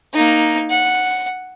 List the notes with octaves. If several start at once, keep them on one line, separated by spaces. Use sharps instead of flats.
A#3 D#4
F#5